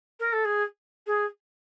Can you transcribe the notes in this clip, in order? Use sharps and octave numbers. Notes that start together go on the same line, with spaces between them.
A#4
A4
G#4
G#4